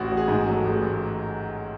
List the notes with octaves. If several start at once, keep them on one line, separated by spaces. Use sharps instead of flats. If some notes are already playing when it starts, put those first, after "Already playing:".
Already playing: A1 F#4
A1
G#4
G#2
G#4
F#3
A4
A1 G#4
A1